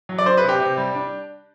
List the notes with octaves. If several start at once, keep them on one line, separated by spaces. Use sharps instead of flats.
F#3
D5
D4 C5
B4
C3
G4
C3
G3
D4